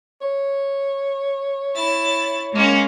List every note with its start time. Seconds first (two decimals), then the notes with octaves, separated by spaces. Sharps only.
0.21 C#5
1.74 E4 A6
2.53 G#3 A#3 C#4